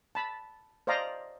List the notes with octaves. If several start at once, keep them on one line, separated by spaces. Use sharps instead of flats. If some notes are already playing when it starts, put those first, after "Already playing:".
A5 B5
C5 D5 D#5 F5 A#5